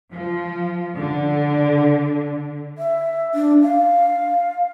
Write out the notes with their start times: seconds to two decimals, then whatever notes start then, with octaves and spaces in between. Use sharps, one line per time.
0.10 F3
0.96 D3
2.78 E5
3.35 D4
3.62 F5